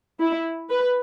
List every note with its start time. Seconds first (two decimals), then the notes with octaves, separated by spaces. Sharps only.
0.20 E4
0.69 B4